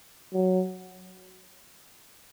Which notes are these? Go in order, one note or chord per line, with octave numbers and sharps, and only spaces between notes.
F#3